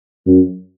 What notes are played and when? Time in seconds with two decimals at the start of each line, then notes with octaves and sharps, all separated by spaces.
0.26 F#2